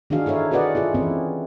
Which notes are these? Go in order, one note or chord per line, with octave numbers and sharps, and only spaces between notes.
D#3 D4 D#4 F#4 G#4 F5
D#4 E4 A4 C#5 F5
F#4 G#4 B4 D5 D#5 F#5
E4 F4 G#4
E3 C4 C#4 E4